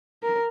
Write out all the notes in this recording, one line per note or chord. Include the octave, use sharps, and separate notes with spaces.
A#4